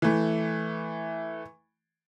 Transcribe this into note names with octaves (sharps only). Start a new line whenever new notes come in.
E3 A3